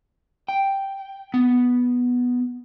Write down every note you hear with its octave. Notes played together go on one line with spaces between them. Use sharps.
G5
B3